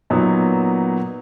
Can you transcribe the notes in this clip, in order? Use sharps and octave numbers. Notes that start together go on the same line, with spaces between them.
A#2 F#3 B3 D#4